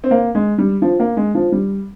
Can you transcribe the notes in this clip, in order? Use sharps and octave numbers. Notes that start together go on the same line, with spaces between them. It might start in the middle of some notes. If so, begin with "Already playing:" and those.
C4
A#3
G#3
G3
F3
A#3
G#3
F3
G3